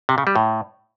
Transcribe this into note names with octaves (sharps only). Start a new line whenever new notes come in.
C3
C#3
G3
A2